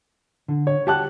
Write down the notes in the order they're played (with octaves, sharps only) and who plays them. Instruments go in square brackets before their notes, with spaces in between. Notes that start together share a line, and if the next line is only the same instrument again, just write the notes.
[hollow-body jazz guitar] D3
[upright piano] C#5
[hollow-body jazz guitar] F#4 [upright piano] G4 A5 F#6